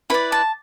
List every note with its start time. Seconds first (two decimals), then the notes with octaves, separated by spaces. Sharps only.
0.10 E4 B4 D5 B5
0.32 A5